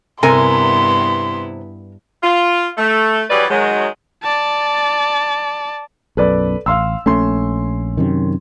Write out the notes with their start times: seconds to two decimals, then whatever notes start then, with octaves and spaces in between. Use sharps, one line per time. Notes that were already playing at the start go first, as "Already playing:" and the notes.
0.23 G2 C3 B3 E4 A#4 G#5 C6
2.22 F4
2.77 A3
3.29 E3 F#3 G3 G#4 B4 D5
3.49 D#3 F#3 G#3
4.23 D5 A5
6.17 B1 F#2 A4 B4 D5
6.66 A1 F5 C6 E6
7.06 A#1 A3 C#4 C6
7.97 F#2 C3 D#3